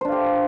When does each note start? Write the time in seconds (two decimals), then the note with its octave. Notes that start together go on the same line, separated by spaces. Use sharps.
0.01 C5
0.05 D4
0.08 F5
0.12 G4